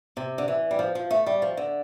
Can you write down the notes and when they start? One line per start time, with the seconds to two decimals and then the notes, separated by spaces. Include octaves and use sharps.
0.17 C3
0.38 D3
0.48 E3
0.71 G3
0.79 F3
0.95 F3
1.11 A3
1.26 G3
1.42 F3
1.57 D3